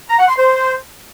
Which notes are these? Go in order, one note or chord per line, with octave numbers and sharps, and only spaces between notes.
A#5
F#5
C6
C5